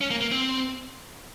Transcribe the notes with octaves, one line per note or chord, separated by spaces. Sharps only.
C#4
A#3
A#3
C4